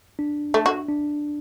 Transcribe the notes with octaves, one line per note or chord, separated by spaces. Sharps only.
D4
A3
F#4
D4